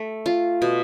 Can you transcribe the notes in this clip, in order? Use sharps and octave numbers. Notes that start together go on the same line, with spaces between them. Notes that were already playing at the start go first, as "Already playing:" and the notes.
Already playing: A3
F4
B2